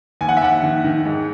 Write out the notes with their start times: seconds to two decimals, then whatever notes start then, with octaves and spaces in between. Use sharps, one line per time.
0.21 D#2 G#5
0.29 F#5
0.37 E5
0.42 D#2 F#5
0.63 D#3
0.84 D#3
1.05 G#2